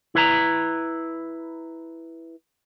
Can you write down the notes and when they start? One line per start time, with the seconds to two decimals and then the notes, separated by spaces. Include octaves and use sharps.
0.15 E4 B4 A#5